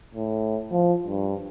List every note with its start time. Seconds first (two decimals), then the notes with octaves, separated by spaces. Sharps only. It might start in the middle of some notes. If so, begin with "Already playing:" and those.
0.14 A2
0.72 F3
1.06 G2